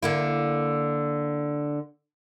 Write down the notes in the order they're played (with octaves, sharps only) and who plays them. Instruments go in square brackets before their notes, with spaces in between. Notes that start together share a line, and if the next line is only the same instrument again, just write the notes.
[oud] D3 A#3 E4